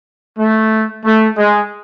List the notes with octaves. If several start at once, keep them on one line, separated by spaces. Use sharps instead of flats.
A3
A3
G#3